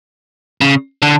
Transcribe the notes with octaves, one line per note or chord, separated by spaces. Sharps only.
C#3
D3